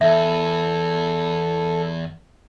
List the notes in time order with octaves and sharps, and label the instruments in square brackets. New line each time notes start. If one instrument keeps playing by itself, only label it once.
[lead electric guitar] E2 [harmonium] A4 [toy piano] E5